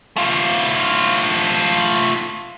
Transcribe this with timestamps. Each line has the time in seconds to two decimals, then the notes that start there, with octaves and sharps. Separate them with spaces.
0.17 A3 F4